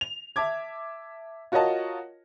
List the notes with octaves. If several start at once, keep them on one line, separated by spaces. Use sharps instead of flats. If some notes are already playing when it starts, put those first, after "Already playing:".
F7
E5 A5 D6 G#6
F4 F#4 A#4 C#5 D#5 A5